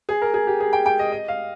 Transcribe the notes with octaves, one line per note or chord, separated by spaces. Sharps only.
G#4
A#4
G#4
G4
G#4
G5
G5
D#5
D#5
F5